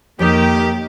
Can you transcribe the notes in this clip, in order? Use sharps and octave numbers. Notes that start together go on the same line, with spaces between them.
F2 D#3 A#3 G4 C#5